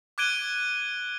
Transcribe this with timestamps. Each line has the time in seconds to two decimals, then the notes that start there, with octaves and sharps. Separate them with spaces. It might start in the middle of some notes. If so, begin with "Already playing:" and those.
0.18 D6 F#6 G#6 D7 D#7 G7